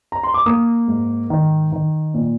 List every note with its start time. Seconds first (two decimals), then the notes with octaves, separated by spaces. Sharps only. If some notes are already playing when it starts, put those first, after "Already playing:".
0.12 A#5
0.23 C6
0.34 D6
0.46 A#3 D#6
0.88 G#2
1.30 D#3
1.72 D#3
2.14 A#2